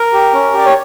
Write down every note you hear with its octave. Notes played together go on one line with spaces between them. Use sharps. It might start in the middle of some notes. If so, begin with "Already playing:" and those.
Already playing: A#4
G4
C#4
G4 D5
C#5